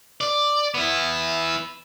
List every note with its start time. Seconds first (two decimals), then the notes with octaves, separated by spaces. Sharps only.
0.21 D5
0.74 B3 E4